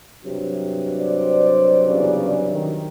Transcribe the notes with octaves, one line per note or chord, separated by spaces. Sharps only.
G2 C3 F#3
C5 D5
E2 C#3 D5
D#3